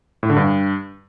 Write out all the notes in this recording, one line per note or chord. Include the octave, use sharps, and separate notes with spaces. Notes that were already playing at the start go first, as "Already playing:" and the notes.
A2
D3
G2